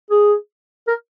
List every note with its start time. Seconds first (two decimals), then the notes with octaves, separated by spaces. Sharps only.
0.10 G#4
0.87 A#4